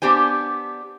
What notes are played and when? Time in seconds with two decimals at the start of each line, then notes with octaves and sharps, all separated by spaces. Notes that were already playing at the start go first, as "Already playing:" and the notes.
0.02 B3 D4 G4 C5 G#5